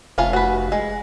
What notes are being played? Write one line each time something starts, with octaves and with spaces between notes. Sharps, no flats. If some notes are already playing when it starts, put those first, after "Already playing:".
F1 A3 C#4 F4
F#4 B4
G#3